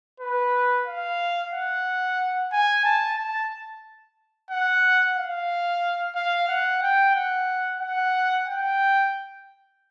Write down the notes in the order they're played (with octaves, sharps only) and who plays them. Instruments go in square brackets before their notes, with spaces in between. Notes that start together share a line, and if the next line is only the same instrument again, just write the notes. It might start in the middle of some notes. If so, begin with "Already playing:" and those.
[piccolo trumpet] B4
F5
F#5
G#5
A5
A5
F#5
F5
F5
F#5
G5
F#5
F#5
G5